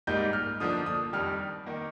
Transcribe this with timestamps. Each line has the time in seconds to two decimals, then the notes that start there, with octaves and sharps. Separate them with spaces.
0.07 G#2 G3 A#3 D#4 G6
0.33 F6
0.60 D3 F3 A#3 D4 D#6
0.86 D#6
1.13 F2 D#3 G3 F6
1.66 D#3 A#3